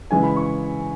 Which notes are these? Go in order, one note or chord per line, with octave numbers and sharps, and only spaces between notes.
C#3 E3 G#3 G#5
B5
C#6